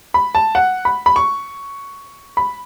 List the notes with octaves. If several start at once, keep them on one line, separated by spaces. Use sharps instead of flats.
B5
A5
F#5
B5
B5
C#6
B5